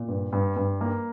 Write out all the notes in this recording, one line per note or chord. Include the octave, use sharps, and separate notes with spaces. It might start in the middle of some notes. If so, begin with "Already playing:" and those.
Already playing: A#2
G2
G2
G2
A#3